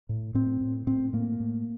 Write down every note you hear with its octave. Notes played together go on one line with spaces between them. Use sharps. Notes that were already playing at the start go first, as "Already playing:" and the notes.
A2
A2 C4
A2
A2 C4
A2 A#3
A2